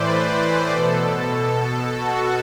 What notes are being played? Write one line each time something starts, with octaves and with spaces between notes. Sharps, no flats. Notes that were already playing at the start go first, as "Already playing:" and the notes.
Already playing: A2 E3 B4 C5 D5
B4
B2 A4
F#4